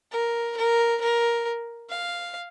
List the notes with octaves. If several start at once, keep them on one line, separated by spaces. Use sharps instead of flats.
A#4
A#4
A#4
F5